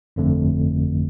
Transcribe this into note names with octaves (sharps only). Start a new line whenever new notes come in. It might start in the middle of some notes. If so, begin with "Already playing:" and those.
G1 F2 D3 A3